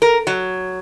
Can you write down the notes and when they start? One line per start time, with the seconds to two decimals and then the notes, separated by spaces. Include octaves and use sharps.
0.02 A#4
0.27 F#3